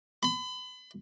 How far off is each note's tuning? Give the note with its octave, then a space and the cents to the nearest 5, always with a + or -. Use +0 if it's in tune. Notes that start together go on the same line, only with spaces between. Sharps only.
B5 +35